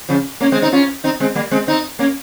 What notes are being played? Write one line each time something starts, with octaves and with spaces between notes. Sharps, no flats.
C#3 F3
A#3 C#4
G#3 C4
C4 D#4
C#4 F4
C4 D#4
G#3 C4
G3 A#3
G#3 C4
C4 D#4
A#3 C#4